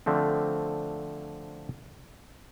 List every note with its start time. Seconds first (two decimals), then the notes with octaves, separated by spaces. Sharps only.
0.06 D3 F3 A3 C4